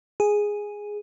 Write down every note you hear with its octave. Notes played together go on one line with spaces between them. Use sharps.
G#4